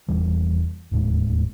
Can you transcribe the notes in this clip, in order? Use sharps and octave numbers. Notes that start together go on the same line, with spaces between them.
F1 E2 E3 G3
E1 D#2 A2 G#3